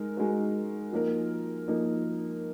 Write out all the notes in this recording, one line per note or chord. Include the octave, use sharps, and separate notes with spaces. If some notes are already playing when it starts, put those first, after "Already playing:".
Already playing: G#3 D#4 A#4
G#3 D#4 F#4 A#4
F3 A#3 D#4 A#4
F3 A#3 D#4 A#4